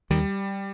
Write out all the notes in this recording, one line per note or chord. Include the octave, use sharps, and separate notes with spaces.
D#2 D#3 G3